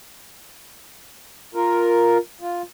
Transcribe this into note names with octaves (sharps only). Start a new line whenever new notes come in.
F4 A#4
F4